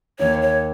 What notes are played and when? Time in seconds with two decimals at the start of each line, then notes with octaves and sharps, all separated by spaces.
0.19 D#2 D#3 A#3 D#4 C#5
0.41 C#5